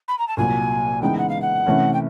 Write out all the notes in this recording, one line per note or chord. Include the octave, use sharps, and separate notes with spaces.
B5
A#5
A5
C2 A#2 F#3 G#5
C#3 E3 G#3 B3 D#4 G5
F#5
F5
F#5
C3 E3 A3 C#4
G5